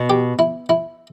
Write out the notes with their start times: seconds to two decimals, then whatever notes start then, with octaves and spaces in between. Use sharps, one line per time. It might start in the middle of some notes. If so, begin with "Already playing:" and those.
Already playing: B2
0.10 G4
0.39 E4
0.69 E4